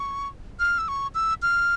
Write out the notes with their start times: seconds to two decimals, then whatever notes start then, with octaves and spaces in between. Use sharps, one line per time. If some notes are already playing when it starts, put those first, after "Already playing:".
Already playing: C#6
0.60 F6
0.78 E6
0.88 C#6
1.15 E6
1.42 F6